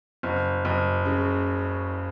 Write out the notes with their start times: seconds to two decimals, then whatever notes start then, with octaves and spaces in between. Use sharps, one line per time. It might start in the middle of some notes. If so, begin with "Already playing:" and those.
0.23 F#1
0.65 F#1
1.05 C#3